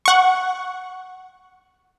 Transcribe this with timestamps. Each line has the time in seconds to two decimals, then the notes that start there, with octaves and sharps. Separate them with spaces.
0.06 F#5 C#6